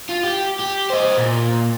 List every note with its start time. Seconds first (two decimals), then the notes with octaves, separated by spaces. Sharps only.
0.09 F4
0.24 G4
0.59 G4
0.90 C5 D#5
1.18 A#2